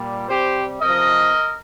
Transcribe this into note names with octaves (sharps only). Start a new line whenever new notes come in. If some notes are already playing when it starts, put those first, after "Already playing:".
Already playing: A#2 G3
C3 G3 G4 C5
C3 F3 A#4 D#5